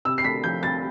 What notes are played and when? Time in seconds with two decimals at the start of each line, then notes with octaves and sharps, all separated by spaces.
0.05 C3 E6
0.18 C7
0.24 A3 B6
0.44 F3 G6
0.63 C2 A6